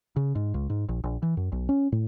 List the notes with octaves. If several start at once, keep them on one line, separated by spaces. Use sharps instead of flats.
C#3
G#2
C#2
G#2
A#1
A#1
E3
F#2
B1
C#4
A2